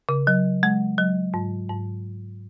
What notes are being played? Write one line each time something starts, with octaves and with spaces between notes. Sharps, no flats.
C#3
F#3
G#3
F#3
G#2
G#2